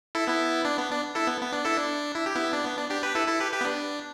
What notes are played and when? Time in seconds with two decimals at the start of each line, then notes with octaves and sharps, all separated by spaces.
0.15 E4 A4
0.27 B3 E4
0.65 D4
0.78 B3
0.91 D4
1.15 E4 A4
1.27 B3
1.41 B3
1.52 D4
1.65 E4 A4
1.77 D4
2.15 E4
2.26 G4
2.36 B3 E4
2.53 D4
2.65 B3
2.78 D4
2.90 D4 G4
3.02 G4 B4
3.15 E4 A4
3.28 E4 A4
3.40 G4 B4
3.53 G4 B4
3.61 B3
3.65 D4